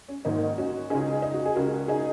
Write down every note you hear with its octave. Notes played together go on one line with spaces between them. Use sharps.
C#4
G#1 G#2 D#3 A#3 D#4
C#4 F#4
C#2 C#3 D#4 G#4
D#4
F#4
G#4
C#2 C#3 F#4 A#4
D#4 G#4